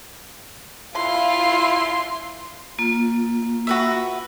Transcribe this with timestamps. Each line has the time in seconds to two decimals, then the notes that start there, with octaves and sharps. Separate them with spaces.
0.96 E4 F4 C6
2.78 A#3 F4
3.67 F#4 B4 E5